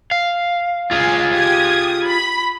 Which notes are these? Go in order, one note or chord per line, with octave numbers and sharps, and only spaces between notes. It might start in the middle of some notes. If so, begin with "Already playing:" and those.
F5
F4 G#4 F5 G#5
G4 D#6 G#6
B5